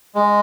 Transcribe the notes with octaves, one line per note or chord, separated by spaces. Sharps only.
G#3